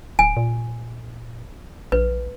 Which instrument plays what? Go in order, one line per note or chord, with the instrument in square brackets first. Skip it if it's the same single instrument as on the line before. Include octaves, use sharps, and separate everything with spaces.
[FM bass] D1 [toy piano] G#5
[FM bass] A#2
[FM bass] A#1 [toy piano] B4